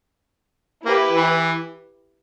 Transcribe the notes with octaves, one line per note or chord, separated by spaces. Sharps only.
A#3 E4 G4 B4
E3